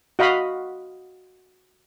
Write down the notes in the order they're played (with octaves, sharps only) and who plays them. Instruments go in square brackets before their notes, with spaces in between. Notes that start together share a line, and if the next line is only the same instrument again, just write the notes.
[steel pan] F#4 D#5 F5 B5